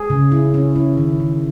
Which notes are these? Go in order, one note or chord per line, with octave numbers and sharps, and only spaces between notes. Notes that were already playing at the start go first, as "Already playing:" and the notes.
Already playing: G#4
C#3
E4
C#4
E4
D#3
D#3